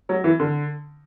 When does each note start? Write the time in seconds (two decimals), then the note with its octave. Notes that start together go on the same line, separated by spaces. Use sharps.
0.09 F#3
0.24 E3
0.40 D3